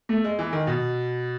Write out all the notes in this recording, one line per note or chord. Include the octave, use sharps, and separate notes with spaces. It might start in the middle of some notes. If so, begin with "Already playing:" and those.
A3
G#3
E3
D#3
B2